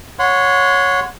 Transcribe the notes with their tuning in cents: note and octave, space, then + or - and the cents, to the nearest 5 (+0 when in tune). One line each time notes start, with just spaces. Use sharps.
C#5 +0 F#5 -25 C6 -25